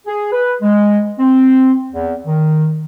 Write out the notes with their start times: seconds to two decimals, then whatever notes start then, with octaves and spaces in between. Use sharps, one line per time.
0.07 G#4
0.33 B4
0.62 G#3
1.20 C4
1.92 E2
2.27 D#3